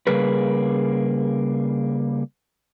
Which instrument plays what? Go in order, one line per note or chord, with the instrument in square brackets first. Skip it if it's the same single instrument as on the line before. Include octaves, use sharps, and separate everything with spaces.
[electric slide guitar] C#3 G3 A#3 G#4 B4